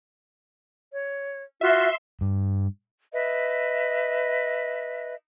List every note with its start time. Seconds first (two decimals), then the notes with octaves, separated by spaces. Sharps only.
0.91 C#5
1.61 F4 F#4 E5 C6
2.21 G2
3.12 B4 D#5 E5